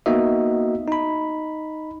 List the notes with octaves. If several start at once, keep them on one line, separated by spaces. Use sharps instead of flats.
A#3 B3 D#4 F#4 D#5 E5
D#4 B5